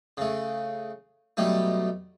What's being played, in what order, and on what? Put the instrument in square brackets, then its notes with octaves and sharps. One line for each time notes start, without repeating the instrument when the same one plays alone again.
[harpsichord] C#3 A3
B2 F#3 G3 A3 D#4